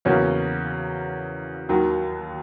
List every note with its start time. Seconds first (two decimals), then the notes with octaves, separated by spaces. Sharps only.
0.05 E2 C#3 F#3 A#3 C#4
1.69 D#2 D#3 F#3